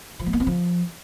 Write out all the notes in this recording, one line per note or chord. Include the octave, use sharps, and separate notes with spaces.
F3
A3
A#3
C4
F3